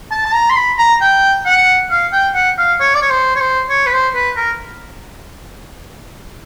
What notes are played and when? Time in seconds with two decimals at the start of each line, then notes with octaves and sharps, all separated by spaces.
0.11 A5
0.26 A5
0.34 A#5
0.50 C6
0.56 B5
0.79 A#5
1.01 G5
1.46 F#5
1.91 F5
2.13 G5
2.35 F#5
2.58 F5
2.80 C#5
2.94 D5
3.02 C#5
3.10 C5
3.36 C#5
3.40 C5
3.70 C#5
3.86 B4
3.92 C5
4.15 B4
4.37 A#4